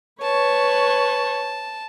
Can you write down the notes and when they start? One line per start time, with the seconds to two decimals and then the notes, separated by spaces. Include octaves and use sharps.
0.22 B4 C#5 A5